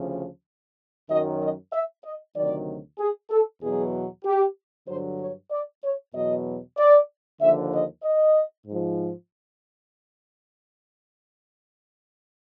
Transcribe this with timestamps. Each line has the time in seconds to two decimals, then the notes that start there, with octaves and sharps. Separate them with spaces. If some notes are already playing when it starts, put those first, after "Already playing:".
Already playing: D2 C#3 F3
1.10 F#2 D#3 F#3 D#5
1.41 D#5
1.73 E5
2.05 D#5
2.36 D2 C3 D#3 F#3 D5
3.00 G#4
3.31 A4
3.62 E2 B2 F#3 G#4
4.25 G4
4.88 G2 D3 F#3 C5
5.20 C#5
5.52 D5
5.84 C#5
6.15 E2 B2 F#3 D#5
6.78 D5
7.41 D#2 D3 F3 E5
7.73 D#5
8.04 D#5
8.67 G#2 F3